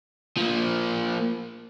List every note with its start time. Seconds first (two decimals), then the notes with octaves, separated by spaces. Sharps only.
0.38 F3 A#3